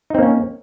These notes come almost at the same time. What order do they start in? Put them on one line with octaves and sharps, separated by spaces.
D#4 C4 A#3 C#4